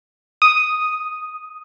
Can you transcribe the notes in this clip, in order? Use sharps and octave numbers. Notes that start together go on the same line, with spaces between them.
D#6